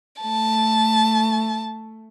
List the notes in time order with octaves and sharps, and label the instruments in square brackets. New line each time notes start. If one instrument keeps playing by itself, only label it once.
[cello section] A3 [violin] A5